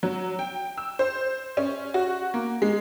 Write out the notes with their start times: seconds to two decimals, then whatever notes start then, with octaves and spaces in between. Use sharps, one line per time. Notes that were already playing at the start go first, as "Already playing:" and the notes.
0.03 F#3
0.39 G5
0.78 E6
0.99 C5
1.57 C#4
1.94 F#4
2.34 A#3
2.62 G#3